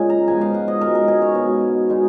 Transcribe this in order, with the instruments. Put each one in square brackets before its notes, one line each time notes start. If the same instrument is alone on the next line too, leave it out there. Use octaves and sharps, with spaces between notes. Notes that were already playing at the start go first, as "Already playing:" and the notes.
Already playing: [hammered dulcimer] A#2 C#3 G#3 C#4 D#4 G#5
A#5
G#2 F3 B3 G#5
F5
F#5
D#5
B2 G#3 C#4 A#4
A#4
G#4
C#5
B2 G#3 B3
B2 G#3 D#4